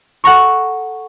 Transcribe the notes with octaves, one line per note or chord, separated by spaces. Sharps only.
A4 F#5 A#5 C#6